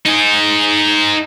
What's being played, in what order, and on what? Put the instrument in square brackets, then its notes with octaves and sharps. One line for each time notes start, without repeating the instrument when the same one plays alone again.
[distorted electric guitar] D#4 G#4